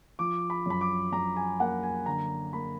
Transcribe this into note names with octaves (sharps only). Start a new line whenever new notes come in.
F3 D6
B5
F#2 B5
D6
F#2 A#5
G#5
A#3 F#5
G#5
D3 A#5
A#3 B5